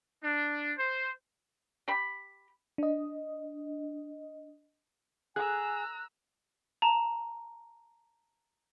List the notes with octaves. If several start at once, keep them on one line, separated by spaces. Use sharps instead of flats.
D4
C5
G4 B5
D4 D#5
G#4 G#5 A#5 E6 F#6
A5 A#5